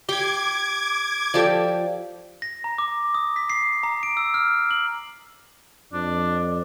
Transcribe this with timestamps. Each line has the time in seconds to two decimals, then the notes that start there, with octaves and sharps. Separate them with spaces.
0.09 G4 C6 D6 G#6
1.34 F3 G4 A4 D5
2.42 A#6
2.64 A#5
2.78 D6
3.14 D#6
3.36 B6
3.50 C7
3.83 A#5
4.03 D7
4.17 E6
4.34 F6
4.71 F#7
5.93 F2 D4